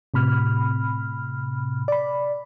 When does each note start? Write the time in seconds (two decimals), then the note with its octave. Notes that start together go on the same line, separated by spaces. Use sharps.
0.14 A2 C3 B5 F6
1.88 D5 B5